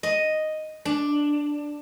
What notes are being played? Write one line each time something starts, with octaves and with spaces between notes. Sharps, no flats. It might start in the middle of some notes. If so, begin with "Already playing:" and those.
D#5
D4